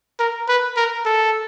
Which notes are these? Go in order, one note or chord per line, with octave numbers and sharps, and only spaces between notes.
A#4
B4
A#4
A4